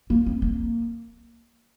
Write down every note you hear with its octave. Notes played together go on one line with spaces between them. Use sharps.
A#3
C4
A#3